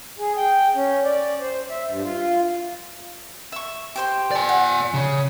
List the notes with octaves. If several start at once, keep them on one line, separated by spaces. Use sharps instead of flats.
G#4
G5
C#4
D5
C5
E5
G2
F4
E5 C#6
G4 C5 C6
D5 G#5
F#5
C#3